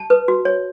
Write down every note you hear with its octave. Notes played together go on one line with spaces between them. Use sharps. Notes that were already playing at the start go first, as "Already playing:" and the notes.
Already playing: A5
B4
F#4
C#5